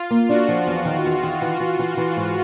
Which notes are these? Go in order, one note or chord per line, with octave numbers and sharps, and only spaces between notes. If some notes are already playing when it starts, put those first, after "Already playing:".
Already playing: F4
A#3
D4 F#4
F3
E2
D#3
E2
D#3
E3
E3
E3
E3
G#2